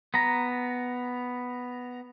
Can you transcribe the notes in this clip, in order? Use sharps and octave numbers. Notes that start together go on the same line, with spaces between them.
B3 A#5